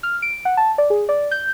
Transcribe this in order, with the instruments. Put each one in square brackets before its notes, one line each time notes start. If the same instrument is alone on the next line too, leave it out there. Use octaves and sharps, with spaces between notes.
[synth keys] F6
D7
F#5
A5
D5
G#4
D5
G6